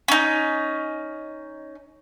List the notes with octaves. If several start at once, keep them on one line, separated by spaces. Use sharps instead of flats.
C#4 D#4